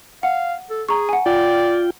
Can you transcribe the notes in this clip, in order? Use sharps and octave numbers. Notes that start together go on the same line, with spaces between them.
F5 F#5
A4
G#4 A#5 C#6
F#5 G#5
F4 D5 G5